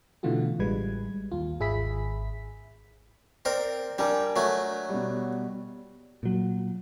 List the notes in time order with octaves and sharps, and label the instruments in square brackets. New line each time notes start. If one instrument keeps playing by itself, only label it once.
[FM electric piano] B2 D3 E3 A3 F4 F#4
A1 G3 G#3 B4 G#6
D#2 F4
G#1 G#4 E5 B5 B6
[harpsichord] C4 A#4 [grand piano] D5
[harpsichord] G3 [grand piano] D4 A#4 G#5
[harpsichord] F#3 A3
[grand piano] B2 G3
[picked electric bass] A#2 F#3